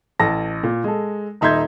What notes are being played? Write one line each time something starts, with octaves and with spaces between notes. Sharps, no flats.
A1 A5 A#6
A#2
G#3 A4
D#1 D#4 E5 C6 G6 G#6